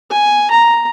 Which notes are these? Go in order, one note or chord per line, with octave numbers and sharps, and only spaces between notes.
G#5
A#5